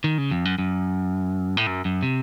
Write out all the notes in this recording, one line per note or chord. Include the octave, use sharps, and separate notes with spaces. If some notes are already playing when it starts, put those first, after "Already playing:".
D#3
C#3
F2
F#2
F#2
A2
F#2
F#2
C3